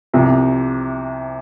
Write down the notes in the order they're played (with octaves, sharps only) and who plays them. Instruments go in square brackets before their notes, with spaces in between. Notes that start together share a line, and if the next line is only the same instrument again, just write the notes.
[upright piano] C2 C3 F3